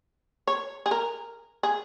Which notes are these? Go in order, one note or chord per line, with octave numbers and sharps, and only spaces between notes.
C#5
G#4
A#4
G#4